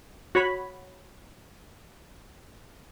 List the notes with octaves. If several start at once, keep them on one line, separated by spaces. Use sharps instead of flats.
F#4 C#5 B5